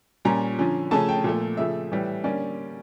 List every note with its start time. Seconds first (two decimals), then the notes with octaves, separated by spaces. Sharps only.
0.25 A#2 G3 C#4 A#5
0.59 D3 F3 C#4
0.91 C#3 F3 A3 C#4 A5
1.09 G5
1.24 A#2 F3 A3
1.57 C#3 F3 A3 E5
1.92 A2 E3 G3
2.24 D3 G3 A#3 C#4 D5